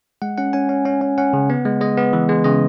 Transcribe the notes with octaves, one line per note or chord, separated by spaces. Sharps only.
G#3 F#5
C#4 F#5
C#4 G#5
C#4
C#4
C#4
C#4 F#5
C#3
B3
G#3
G#3 D#5
B3
E3
G#3
C#3 D#5